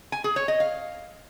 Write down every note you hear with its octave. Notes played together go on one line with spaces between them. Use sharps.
G#5
G#4
C#5
D#5
F5